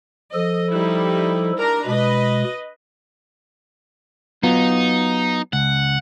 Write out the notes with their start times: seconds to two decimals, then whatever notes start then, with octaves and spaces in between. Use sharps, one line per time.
0.34 F3 A4 D#5
0.74 G3 D#4 E4
1.58 D4 A#4 A#5
1.87 B2 G#3 B4 D#5
4.43 F#3 B3 D#4 F4
5.53 C#2 F#5